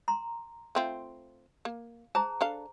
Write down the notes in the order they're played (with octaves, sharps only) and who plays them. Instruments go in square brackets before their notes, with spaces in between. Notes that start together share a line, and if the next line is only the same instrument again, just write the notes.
[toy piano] A#5 C6
[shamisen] A3 C4 F4
A#3
[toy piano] G#4 C5 A#5 [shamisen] A5
[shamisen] D4 A4 F5